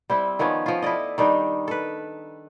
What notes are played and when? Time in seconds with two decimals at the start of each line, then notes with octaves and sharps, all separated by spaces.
0.10 G3 C4 E4
0.39 D#3 F3 B3 C#4
0.66 F3 F4
0.82 E4 A4 D5 D#5
1.18 D#3 G3 D4 D#4
1.68 A4 B4